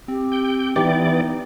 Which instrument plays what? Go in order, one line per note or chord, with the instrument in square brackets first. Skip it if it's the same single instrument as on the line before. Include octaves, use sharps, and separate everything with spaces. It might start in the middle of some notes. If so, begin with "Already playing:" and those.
[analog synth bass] C4 [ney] G4
[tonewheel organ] G5
[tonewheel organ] E3 D5 [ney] B3 [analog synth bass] D#4 [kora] G4